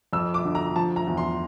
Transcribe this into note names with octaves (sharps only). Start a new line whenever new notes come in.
F2 E6
D6
D3
A#5
F3 A5
A#5
E2
C6